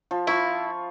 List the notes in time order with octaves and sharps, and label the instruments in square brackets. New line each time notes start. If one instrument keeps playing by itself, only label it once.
[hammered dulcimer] F3
[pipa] E4 [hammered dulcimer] F4 B5 C#6